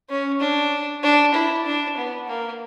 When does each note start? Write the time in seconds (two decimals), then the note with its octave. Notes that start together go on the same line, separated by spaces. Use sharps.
0.09 C#4
0.40 D4
1.03 D4
1.34 E4
1.65 D4
1.97 B3
2.28 A#3